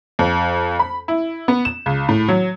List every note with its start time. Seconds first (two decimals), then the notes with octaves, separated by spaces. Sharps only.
0.19 F2
0.79 B5
1.08 E4
1.48 B3
1.65 E7
1.86 C#2
2.09 A2
2.28 F#3